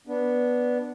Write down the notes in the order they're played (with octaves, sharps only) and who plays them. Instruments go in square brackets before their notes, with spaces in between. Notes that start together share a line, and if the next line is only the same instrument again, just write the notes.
[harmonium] B3 D4